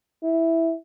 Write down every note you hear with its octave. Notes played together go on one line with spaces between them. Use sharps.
E4